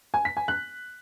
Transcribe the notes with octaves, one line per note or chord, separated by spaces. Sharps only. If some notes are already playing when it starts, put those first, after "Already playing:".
G#5
B6
G#5
F#6